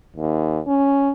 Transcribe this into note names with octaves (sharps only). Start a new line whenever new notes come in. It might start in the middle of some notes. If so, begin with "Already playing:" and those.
D#2
C#4